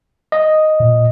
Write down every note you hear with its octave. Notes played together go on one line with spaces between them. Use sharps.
D#5
A#2